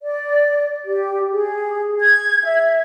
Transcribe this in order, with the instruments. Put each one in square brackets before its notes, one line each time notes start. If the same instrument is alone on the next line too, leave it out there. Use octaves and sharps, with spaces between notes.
[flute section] D5
G4
G#4
G#6
E5